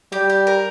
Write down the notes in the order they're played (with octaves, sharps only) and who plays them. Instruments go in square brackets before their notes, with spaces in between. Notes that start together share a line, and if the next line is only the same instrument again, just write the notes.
[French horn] G3 [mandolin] G4
[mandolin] G4
A#4